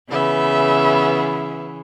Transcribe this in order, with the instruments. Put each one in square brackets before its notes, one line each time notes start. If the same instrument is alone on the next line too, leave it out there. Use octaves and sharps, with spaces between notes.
[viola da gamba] C#3 E3 [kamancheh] B3 E5